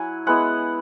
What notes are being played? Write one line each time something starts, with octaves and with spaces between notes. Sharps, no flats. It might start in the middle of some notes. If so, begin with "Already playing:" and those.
Already playing: F#3 E4 F#5 G#5
G#3 B3 E4 F#5